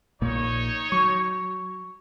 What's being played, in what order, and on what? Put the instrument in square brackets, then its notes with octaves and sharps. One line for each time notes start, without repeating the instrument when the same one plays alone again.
[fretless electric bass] A#1 A#2 A#3 [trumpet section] D#4 C#5
[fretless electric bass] F#3 [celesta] C#6